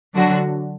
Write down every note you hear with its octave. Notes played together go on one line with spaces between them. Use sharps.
D3 F#3 D4 F#4